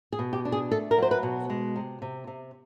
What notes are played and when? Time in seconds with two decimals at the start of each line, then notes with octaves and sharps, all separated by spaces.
0.12 G#4
0.19 B2
0.33 G4
0.45 D4
0.52 G#4
0.71 A3 A4
0.91 A#4
0.98 F#3 C5
1.11 B4
1.23 B2
1.50 G#3
1.76 C3
2.02 C3
2.27 C3